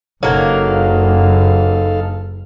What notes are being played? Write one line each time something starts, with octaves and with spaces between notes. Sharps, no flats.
F#1 F#3 A#3 D#4 A4 F5